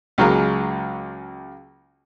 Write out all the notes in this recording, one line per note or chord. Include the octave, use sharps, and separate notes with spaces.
C#2 F#3 G#3 A#3